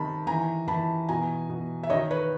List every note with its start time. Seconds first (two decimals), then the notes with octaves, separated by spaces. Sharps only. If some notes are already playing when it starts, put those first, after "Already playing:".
Already playing: C3 D#3 A5 B5
0.27 E3 G#5 A#5
0.68 E3 A5 B5
1.09 B2 G#5 A#5
1.49 B2
1.83 E5
1.90 D#3 C#5 D#5
2.11 B4 C#5